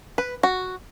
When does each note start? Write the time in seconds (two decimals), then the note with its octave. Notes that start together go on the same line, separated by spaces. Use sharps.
0.18 B4
0.43 F#4